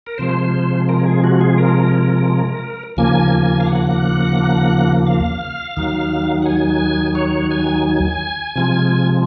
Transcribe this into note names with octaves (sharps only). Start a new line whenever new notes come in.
A#4
C3 F3 G#3 C5
A#4
G#4
F#4
G#4
A#4
D#2 C#3 F3 A#3 G#5
F5
F#5
F5
D#2 D#3 F#3
F#5
G#5
C#5
G#5
C3 F3 G#3